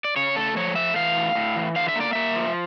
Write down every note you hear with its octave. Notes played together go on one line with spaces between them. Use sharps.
D5
C#3 C#5
A3 A4
F3 C#5
A3 E5
E3 F5
A2
A2
E3
D3 F5
E5
A#3
D5
A#3 E5
F3